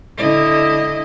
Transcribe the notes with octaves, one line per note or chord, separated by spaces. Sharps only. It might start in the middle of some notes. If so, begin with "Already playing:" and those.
D3 E4 D#5